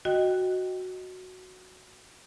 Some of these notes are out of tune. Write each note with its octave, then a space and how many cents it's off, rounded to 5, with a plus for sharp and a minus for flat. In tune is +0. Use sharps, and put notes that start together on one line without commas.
F#4 +0 D#5 +0 G5 +0